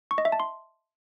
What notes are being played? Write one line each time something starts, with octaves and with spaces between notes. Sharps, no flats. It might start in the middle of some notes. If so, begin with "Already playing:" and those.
C#6
D#5
E5
A5
C6